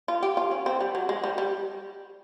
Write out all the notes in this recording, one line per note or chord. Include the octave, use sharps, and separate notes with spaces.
F4
G4
F4
C#4
C4
G3
F#3
G#3
G3
G3